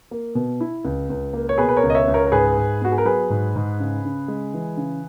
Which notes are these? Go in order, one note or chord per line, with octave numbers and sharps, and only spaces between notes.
A#3
B2
E4
C#2
C#2
A#3
C#5
B2 G#4 B4
B4
A#4 C#5
C#2
D#5
C#5 E5
C#2
A#4 C#5
A#4
G#2 G#4 B4
G#2
B3 F#4
G#4
A#4
F#3 G#4 B4
G#2
G#2
C#3
C#3
G#3
E3
C#3